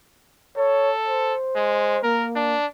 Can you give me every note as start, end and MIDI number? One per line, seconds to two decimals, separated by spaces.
0.58 1.34 69
0.58 0.92 73
1.07 2.00 72
1.56 1.98 56
2.03 2.56 58
2.03 2.27 70
2.36 2.66 62